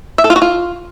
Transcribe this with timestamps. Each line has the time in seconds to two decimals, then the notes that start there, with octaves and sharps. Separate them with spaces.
0.18 E5
0.24 A4
0.30 F4
0.36 F#4
0.42 F4